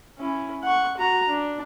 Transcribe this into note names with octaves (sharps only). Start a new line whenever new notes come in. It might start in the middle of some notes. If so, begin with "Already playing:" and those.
C#4 E4
F#5 C#6
F#4 A#5
D4